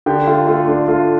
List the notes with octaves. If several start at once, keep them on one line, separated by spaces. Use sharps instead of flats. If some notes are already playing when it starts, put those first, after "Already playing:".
D3 G4 G5
A3 F4 F5
A3 F4 F5
A3 D4 D5
A3 F4 F5